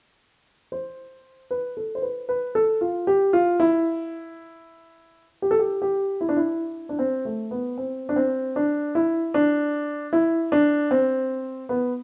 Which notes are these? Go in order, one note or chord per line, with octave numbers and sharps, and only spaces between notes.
C5
B4
A4
C5
B4
B4
A4
F4
G4
F4
E4
G4
A4
G4
G4
E4
D4
E4
D4
C4
A3
B3
C4
D4
C4
D4
E4
D4
E4
D4
C4
B3